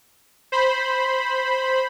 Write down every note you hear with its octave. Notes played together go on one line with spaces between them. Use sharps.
C5 B5